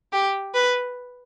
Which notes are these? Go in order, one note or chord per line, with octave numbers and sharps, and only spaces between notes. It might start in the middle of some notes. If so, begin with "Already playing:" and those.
G4
B4